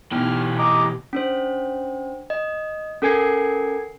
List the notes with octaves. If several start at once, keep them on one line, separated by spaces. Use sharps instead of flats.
B2 E3 B3 D#4 G4 F6
D#5 A#5 D6
C#4 D4 C5
D#5
C#4 A4 A#4 G#5 G#6 C7